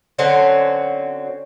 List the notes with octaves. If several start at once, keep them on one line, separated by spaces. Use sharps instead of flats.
D3 F#3 C4 C#4